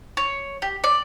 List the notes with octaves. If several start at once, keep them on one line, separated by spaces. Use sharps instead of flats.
C#5
G4
D5